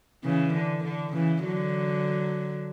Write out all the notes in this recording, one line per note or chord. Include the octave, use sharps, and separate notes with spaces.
C#3 E3
D3
D3
C#3 E3
D3 F#3